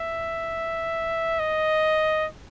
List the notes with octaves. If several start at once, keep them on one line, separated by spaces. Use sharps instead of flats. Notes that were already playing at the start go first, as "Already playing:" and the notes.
Already playing: E5
D#5